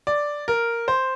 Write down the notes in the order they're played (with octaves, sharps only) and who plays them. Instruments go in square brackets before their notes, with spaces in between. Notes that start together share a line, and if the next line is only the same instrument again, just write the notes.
[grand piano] D5
A#4
C5